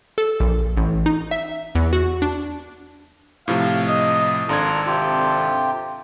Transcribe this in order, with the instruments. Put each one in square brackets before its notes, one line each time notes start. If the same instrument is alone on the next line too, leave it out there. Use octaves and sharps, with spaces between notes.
[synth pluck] A4
A#1
A1
D#4
E5
E2
F#4
D4
[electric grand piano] A2 C3 F3 [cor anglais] F5
[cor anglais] D#5
[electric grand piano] G#1 D4 G#6 [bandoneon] F4 A#5 F6 [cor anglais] A4
[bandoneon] C3 F4 G4